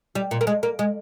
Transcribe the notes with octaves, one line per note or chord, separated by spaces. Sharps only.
G3
A#2
A#3
G#3
A#3
G#3